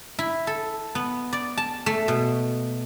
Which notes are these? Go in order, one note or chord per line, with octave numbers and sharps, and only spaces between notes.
E4
A4
B3
D5
A5
A3
B2